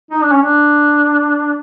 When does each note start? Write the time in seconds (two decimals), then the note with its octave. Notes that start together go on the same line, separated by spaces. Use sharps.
0.11 D#4
0.22 D4
0.32 C#4
0.43 D4